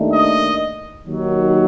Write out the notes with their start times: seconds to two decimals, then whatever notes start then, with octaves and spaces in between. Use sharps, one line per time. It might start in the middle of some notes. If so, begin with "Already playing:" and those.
Already playing: D#2 D#3 A3 D4
0.13 D#5
1.06 D#2 D#3 F#3